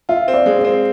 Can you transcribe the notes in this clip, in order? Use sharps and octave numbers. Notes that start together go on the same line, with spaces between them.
F4 E5
C4
D5
G#3
D5
C4